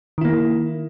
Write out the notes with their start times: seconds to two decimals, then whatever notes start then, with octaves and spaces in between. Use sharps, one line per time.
0.18 D#3
0.21 E4
0.25 A#3